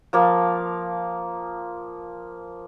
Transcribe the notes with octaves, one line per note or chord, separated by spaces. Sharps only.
F3 A#3 F5